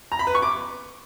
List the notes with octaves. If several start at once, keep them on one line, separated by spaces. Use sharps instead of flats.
A#5
B5
B4
C#6
D6